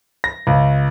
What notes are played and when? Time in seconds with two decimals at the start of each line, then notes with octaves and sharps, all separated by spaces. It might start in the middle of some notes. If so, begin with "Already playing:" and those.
0.24 A#6
0.47 C#2